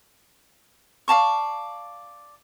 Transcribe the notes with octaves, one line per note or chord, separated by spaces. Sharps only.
D5 F5 A5 C#6